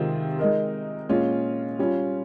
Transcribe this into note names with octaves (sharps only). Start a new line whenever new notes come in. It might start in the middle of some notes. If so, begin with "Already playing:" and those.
Already playing: C3 D#3 G#3 C4 F4
G#3 D#4 A#4
A#2 G#3 C#4 F4
G3 C#4 F4